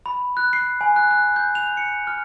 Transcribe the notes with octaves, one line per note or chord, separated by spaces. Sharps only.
B5
F#6
C7
G#5
F#6
F#6
G6
F7
C#7
F6